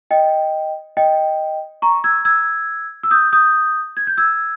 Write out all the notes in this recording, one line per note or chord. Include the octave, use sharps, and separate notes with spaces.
D#5 G5
D#5 G5
A#5 C#6
E6 G#6
E6 G#6
E6
D#6 G6
D#6 G6
G#6
G6
E6 G#6